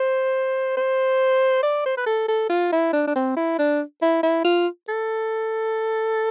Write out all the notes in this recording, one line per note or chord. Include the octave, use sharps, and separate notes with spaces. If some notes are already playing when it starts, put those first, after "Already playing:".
Already playing: C5
C5
D5
C5
B4
A4
A4
F4
E4
D4
D4
C4
E4
D4
E4
E4
F4
A4